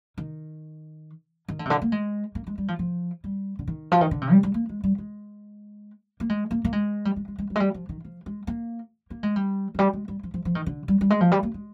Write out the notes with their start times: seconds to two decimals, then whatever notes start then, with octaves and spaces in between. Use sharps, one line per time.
0.18 D#3
1.48 D#3
1.59 D3
1.65 C3
1.70 D3
1.82 A#3
1.92 G#3
2.35 A#3
2.47 G#3
2.58 G3
2.68 F3
2.79 F3
3.24 G3
3.59 D3
3.67 D#3
3.92 F3
4.01 D#3
4.11 D3
4.21 C3
4.32 G3
4.43 G3
4.54 A#3
4.69 G#3
4.84 G3
4.98 G#3
6.20 A#3
6.30 G#3
6.51 A#3
6.65 A#3
6.73 G#3
7.05 G3
7.16 G#3
7.28 G#3
7.38 G#3
7.50 G3
7.56 G#3
7.60 G3
7.74 F3
7.89 D#3
8.04 F3
8.26 G#3
8.47 A#3
9.10 A#3
9.23 G#3
9.36 G3
9.74 F3
9.79 G3
9.93 G#3
10.08 G3
10.23 F3
10.34 F3
10.45 F3
10.55 D#3
10.66 D3
10.88 G3
11.01 G3
11.10 G#3
11.21 F3
11.32 G3
11.43 A#3
11.54 G#3